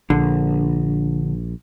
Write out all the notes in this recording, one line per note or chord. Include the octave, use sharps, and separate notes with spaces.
A#1 D3